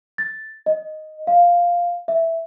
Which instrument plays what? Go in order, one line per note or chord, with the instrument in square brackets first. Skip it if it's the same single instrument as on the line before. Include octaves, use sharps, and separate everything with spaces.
[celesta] A6
D#5
F5
E5